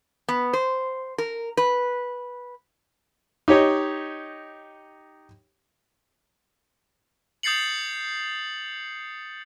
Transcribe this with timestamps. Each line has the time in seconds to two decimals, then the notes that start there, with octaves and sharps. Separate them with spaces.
0.28 B3
0.53 C5
1.18 A#4
1.57 B4
3.48 D#4 G4 C#5 D#5
7.43 D#6 G6 A6 C7 C#7 F#7